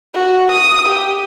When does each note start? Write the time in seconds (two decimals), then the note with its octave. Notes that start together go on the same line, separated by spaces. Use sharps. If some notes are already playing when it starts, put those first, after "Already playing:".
0.14 F#4
0.52 D#6
0.89 G4